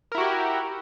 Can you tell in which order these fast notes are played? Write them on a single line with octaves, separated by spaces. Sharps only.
A#4 E4 F#4 G4